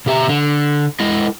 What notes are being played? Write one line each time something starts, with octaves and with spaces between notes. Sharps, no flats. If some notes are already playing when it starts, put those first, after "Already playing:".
B2 G4 E5 A#5
D3
G#3 E4 D#5